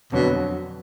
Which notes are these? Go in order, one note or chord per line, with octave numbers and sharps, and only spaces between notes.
F2 B2 D3 F#3